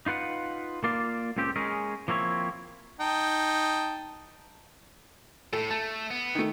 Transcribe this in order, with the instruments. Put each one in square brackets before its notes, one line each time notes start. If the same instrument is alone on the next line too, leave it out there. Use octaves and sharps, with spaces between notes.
[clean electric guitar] D#4 F4 B4 F#5
A#3 F4 D5 F5
C#2 A#2 C#3 C4 G4
G#3 C#4 G#4 A#4
F3 A#3 C4 E4 C#5
[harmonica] D#4 G5 A5
[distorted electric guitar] A2 [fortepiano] A4
[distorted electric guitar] A3 [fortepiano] A5
[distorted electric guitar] B3
[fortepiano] D#3 A3